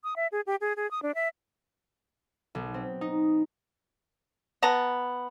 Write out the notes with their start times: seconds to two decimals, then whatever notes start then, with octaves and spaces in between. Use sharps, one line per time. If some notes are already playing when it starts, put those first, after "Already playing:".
0.04 D#6
0.16 E5
0.32 G#4
0.47 G4
0.61 G#4
0.76 G#4
0.91 D#6
1.02 D4
1.15 E5
2.55 B1
2.74 C4
3.01 D#4
4.63 B3 A5 A#5